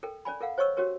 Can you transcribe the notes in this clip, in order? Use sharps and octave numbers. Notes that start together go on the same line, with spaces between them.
A4 A#4 G5
C#4 D5 G#5 B5
A4 A#4 F5 F#5
C5 C#5 D#5 C#6 E6
C#4 F#4 G4 A#4 C#5